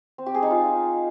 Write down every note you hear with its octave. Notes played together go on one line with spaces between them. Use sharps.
C4
G4
G#4
D#4
F4